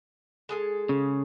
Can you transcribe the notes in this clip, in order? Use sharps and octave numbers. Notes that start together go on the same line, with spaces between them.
G#3 G#4 A4
C#3